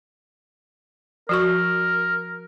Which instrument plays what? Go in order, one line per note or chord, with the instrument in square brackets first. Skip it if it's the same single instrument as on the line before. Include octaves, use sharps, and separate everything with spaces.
[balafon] F3 F#4 C#6 [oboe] A#4